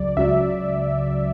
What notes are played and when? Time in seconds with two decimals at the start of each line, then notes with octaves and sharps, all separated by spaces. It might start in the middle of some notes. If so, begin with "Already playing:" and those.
Already playing: C#2 C#3 F#3 D5
0.17 C#2 C#3 F#3 E5